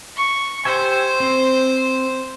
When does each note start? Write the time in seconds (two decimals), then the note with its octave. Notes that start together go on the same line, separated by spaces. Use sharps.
0.16 C#6
0.65 G4 C5 E5 G#5
1.20 C4